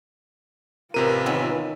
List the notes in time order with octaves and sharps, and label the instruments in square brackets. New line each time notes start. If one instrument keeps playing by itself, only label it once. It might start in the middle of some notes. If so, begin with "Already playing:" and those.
[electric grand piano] A1 C3 D#7 [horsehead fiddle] F4 B4 [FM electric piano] A#4
[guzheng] D#3 B3 C#4 [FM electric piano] E6